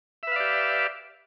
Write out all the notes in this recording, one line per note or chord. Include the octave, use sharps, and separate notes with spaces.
G4 B4 D5 E5 F5